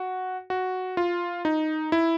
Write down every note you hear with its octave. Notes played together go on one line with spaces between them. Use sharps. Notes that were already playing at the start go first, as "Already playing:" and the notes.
Already playing: F#4
F#4
F4
D#4
E4